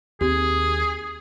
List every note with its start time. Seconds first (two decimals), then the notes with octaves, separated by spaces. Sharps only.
0.21 D#2 C4 G4 G#4